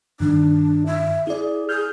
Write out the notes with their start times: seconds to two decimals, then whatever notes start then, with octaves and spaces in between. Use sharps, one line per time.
0.20 G2 D#3 D4
0.86 E5
1.27 E4 G#4 D5
1.69 G#4 F6 G6